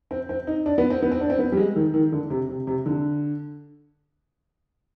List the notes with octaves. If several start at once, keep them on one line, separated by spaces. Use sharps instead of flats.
C4
C4
D#4
D4
B3
C4
B3
C4
D4
C4
B3
G3
G#3
D#3
D#3
D3
C3
C3
C3
D3